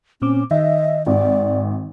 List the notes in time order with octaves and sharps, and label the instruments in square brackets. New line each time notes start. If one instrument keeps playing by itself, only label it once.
[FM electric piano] A#2 C4 D6 [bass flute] C#4
[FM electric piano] D#3 [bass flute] D#5 [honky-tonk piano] E5
[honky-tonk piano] G#1 [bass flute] D5